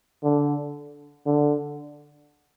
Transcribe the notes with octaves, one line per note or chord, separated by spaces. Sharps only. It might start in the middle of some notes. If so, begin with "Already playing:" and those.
D3
D3